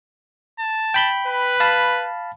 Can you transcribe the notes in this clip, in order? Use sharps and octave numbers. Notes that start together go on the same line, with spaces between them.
A5
G5 B5 G6
B4
F5 A5 B5